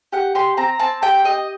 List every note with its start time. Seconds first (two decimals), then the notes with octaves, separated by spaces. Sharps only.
0.12 G4 F#5
0.35 G4 C6
0.57 C4 A#5
0.79 C4 A5
1.02 G4 G5
1.24 G4 D#5